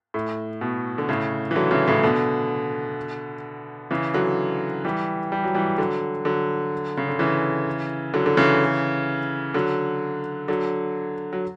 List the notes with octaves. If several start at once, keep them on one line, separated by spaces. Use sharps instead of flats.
A2
B2
D3
A2 C#3
E3
D3 F#3
C#3 E3
A2 C#3
B2 D3
C#3 E3
D3 F#3
E3 G3
G3
F#3
E3 G3
D3 F#3
D3 F#3
C#3
D3
C#3 E3
D3 F#3
D3
C#3 E3
D3 F#3
D3 F#3
F#3